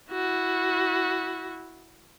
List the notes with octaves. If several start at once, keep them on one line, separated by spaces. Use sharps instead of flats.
E4 F#4